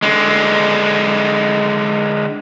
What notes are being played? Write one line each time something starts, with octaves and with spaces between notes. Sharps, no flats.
D3 G#3